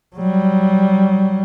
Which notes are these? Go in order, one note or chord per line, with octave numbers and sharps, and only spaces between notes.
F#3 G3